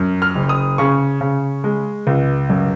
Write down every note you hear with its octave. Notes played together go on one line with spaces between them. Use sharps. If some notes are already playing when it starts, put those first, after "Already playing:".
Already playing: F#2
F6
F#1
D#6
C#3 C#6
C#3
G#3
C#2
F#2